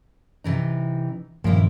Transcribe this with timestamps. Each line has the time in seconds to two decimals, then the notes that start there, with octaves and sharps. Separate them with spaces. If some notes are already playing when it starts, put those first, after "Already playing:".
0.44 C3 E3 D#4
1.44 D#1 G2 F3 A#3 C#4 E4